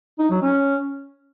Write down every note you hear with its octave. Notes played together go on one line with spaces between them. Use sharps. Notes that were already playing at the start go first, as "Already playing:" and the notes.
D#4
F#3
C#4